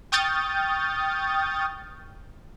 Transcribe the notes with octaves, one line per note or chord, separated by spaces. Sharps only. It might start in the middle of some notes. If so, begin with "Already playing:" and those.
G5 C#6 D#6 F6 G6 A6